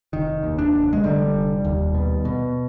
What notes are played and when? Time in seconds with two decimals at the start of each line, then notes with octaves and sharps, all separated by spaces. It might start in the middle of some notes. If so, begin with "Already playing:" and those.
0.13 F1 D#3
0.43 D#2
0.59 D4
0.74 F1
0.93 G#3
1.04 D3 G3
1.34 F1
1.64 D#2
1.94 B2
2.25 B2